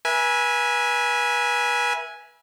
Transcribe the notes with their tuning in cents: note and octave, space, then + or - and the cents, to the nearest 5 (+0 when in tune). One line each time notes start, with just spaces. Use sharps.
B4 -35 E5 +0 G#5 +0